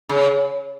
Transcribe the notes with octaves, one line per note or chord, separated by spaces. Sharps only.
C#3